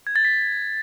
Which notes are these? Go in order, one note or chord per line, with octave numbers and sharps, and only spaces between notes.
G#6
A6
B6